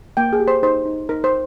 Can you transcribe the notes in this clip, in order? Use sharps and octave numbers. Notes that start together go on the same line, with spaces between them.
A#3 G5
G#4
G4
C5
D#4 C5
D#4
D#4 A#4
C5